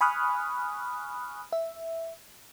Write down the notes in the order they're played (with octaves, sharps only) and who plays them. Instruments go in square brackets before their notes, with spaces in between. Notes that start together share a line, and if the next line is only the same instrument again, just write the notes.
[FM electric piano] G#5 B5 C#6 D#6 F6 F#6
E5